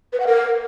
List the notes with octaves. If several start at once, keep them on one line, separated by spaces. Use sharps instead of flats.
B4
F#5
A#4